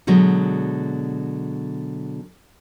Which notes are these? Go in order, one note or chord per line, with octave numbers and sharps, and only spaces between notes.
B2 D3 F#3 G#3